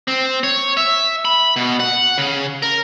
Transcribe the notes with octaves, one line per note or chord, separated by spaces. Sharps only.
C4
C#5
E5
B5
B2
F#5
C#3
A#4